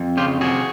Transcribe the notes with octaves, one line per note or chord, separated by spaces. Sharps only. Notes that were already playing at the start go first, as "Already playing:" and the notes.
Already playing: F2
C#3 F4 G4
C3 F#4 G#4